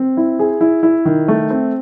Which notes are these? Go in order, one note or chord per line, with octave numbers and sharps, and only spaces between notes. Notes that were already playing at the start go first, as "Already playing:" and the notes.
Already playing: C4
E4
G#4
E4
E4
D#3
A3
C4